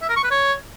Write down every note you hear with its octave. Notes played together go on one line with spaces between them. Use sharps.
E5
A#4
C#6
B4
C#5